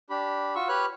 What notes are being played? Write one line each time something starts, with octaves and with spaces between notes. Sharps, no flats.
D4 G4 B5
F4 F#4 C#6 E6
G4 B4 C#5 B5 F6 F#6